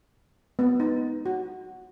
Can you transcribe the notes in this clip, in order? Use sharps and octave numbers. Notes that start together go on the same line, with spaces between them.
B3
D#4
F#4